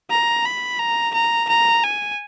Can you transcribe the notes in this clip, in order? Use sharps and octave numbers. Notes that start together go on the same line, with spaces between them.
A#5
B5
A#5
A#5
A#5
G#5